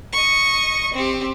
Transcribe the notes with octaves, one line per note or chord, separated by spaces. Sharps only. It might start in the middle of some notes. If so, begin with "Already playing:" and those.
D#5 C#6
C4 G4